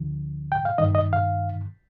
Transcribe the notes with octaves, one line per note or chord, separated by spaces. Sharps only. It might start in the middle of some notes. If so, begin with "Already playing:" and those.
Already playing: D2 D3 F3
G5
F5
G2 D#3 D#5
D#5
F5